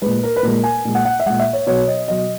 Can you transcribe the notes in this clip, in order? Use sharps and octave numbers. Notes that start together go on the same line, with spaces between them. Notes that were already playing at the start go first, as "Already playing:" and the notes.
A#2 G#3 B4
A#4
B4
A#2 G#3 A#4
G#5
A#2 G#3
F#5
F#5
E5
A#2 G#3 F#5
E5
C#5
B2 F#3 C#5
D#5
B2 F#3 D#5